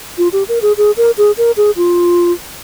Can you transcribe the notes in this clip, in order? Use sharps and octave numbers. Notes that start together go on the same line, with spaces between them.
F4
G4
A#4
G#4
G#4
A#4
G#4
A#4
G#4
F4